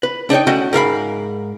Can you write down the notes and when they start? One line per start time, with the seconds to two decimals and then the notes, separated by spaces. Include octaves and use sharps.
0.03 B4
0.30 D4 D#4 C#5 G5
0.47 A3 C#4 F#4 D#5 F#5 G5
0.73 G#2 A#4 F5 B5